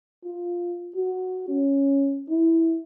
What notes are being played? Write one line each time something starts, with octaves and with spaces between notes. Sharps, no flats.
F4
F#4
C#4
E4